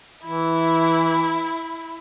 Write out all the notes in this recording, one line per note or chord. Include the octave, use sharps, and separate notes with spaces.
E3 E4